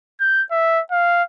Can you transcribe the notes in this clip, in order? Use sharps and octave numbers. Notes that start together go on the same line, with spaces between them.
G6
E5
F5